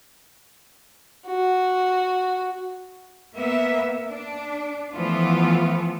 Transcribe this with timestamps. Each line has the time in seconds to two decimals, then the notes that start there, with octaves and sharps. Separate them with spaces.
1.26 F#4
3.35 A#3 B3 E5
4.09 D4
4.93 E3 F3 A3 B3 F4